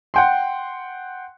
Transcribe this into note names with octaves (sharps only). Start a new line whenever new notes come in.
F#5 G5 C6